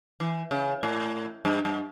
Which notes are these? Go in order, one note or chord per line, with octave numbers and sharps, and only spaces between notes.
E3
C#3
A2
G2
G2